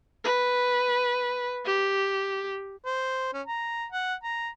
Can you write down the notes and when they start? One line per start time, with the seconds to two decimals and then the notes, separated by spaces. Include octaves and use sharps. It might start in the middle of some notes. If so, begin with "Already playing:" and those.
0.24 B4
1.65 G4
2.85 C5
3.33 C#4
3.47 A#5
3.92 F#5
4.23 A#5